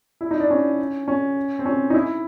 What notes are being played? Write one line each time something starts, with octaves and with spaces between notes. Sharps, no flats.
E4
D#4
D4
C#4
C#4
C4
C#4
D#4
E4